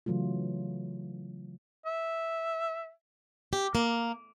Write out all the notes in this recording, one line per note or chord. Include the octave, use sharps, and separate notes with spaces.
C#3 E3 F#3 A3 F4
E5
G4
A#3